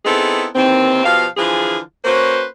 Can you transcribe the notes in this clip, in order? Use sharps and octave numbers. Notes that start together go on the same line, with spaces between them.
B3 C4 D#4 E4 G#4 A4
D#2 D#3 E3 C4
B2 F3 G4 F5
D3 E3 F3 F4 G#4
A#3 C#4 F#4 B4 C5